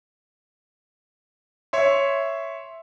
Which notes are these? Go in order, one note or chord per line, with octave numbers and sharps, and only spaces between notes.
C#5 E5 C6